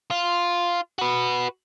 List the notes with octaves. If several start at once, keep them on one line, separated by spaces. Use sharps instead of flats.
F4
F#4 B4